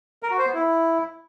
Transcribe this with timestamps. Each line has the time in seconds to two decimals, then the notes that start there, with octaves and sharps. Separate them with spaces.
0.23 A#4
0.31 F#4
0.38 C5
0.46 B3
0.54 E4